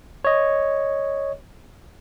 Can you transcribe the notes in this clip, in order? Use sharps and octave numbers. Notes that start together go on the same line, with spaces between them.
C#5 D#5